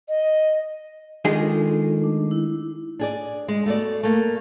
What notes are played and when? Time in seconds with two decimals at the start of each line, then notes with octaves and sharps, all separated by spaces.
0.08 D#5
1.25 D#3 G#3 D4 F4 G#4 A4
2.01 A3 D4
2.31 E4
2.99 D4 G#4 D5
3.48 G#3
3.66 A3 B3 F#4 D5
4.03 A3 A#3